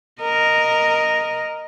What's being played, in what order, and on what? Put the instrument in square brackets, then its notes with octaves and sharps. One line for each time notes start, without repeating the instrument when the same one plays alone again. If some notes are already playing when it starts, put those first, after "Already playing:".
[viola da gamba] A#4 D#5